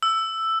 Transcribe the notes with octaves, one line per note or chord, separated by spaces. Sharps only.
E6